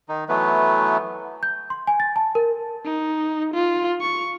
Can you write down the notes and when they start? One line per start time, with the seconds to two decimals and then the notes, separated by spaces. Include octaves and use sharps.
0.09 D#3 D#4
0.29 E3 F#3 A3 B3 B4
1.43 G6
1.70 C6
1.87 G#5
2.00 A6
2.16 A5
2.35 A#4
2.85 D#4
3.54 F4
4.01 C#6